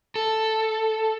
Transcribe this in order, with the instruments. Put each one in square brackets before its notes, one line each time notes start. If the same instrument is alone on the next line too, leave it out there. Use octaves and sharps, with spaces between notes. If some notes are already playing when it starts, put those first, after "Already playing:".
[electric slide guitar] A4